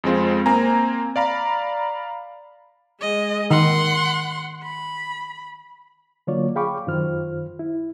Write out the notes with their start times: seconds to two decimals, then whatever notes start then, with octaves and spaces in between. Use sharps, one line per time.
0.04 F2 G#3 C4 F4
0.46 A#3 C4 G#5 A#5
1.16 D5 F5 A#5 B5
3.01 G#3 D#5
3.51 D#3 F#5 C6
4.63 B5
6.27 D3 F#3 A#3 F4 C#5 D5
6.56 G#4 F5 G5 B5 C#6 D6
6.87 F#2 D#3 F4 C5 F6
7.59 E4